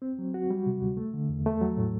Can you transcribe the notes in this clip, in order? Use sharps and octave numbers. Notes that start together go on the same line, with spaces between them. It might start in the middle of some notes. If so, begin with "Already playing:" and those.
C4
F#3
F#4
G3
C3
D2
A3
D3
E2
A3
F#3
A2